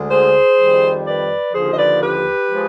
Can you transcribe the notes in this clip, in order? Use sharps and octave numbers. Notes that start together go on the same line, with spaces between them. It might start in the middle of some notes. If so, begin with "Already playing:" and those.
Already playing: D2 D3 G#3
G#4 C5
F2 D#3 G3
B4 D5
D#2 D3 F3 G#4 C5
D#5
B4 D5
G4 B4
F3 G#3